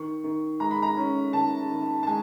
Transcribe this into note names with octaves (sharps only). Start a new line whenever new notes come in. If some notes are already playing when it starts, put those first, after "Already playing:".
Already playing: D#3 C#6
D#3
G#3 A#5
B5
A#5
C#4
D#3 A5
D#3
A5
G#3 G#5